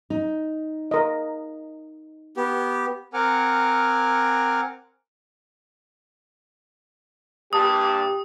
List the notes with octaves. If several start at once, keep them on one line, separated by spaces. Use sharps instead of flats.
D#4
A#4 D#5
B3 G4
C4 A#4 F#5 G#5 D6 F6
G2 A#2 G4 A5 D#6